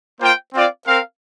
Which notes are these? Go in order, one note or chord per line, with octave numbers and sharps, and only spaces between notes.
A#3 F4 C5 G5
C4 F4 D5 F5
C4 A#4 F5